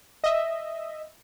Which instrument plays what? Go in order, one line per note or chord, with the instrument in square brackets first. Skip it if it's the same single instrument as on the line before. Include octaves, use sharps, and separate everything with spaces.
[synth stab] D#5 E5